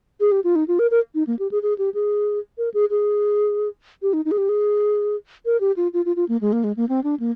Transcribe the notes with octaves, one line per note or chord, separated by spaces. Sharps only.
G#4
G4
F4
D#4
F4
A#4
A#4
D#4
A#3
G4
G#4
G#4
G4
G#4
A#4
G#4
G#4
G4
D#4
D#4
G#4
G4
G#4
A#4
G4
F4
F4
F4
F4
A#3
G#3
A#3
G#3
A#3
C4
D4
A#3